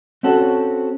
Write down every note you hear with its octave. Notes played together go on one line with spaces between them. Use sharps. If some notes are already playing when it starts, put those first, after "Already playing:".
C4 C#4 F#4 A4